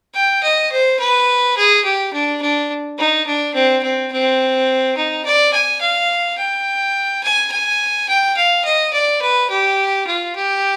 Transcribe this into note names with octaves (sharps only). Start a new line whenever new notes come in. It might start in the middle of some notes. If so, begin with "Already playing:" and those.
G5
D#5
C5
B4
G#4
G4
D4
D4
D#4
D4
C4
C4
C4
D#4
D5
G#5
F5
G5
G#5
G#5
G5
F5
D#5
D5
B4
G4
F4
G4